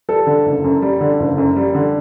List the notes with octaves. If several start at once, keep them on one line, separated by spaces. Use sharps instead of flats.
G3 A4
D3
F#1
F#2
G3
D3
F#1
F#2
G3
D3